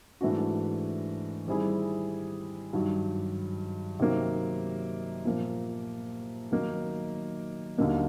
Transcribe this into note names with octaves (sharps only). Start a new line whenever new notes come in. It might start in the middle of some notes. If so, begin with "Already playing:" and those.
G#2 E3 A3 D4 F#4
D#3 G3 C4 E4 G#4
G2 D#3 F#3
C3 D#3 F#3 A#3
A#2 F3 A#3
D#3 F#3 A#3 D#4
D#2 D3 F#3 A#3 D#4